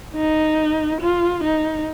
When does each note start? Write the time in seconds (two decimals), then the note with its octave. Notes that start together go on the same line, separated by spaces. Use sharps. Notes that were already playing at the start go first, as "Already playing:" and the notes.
0.16 D#4
1.01 F4
1.43 D#4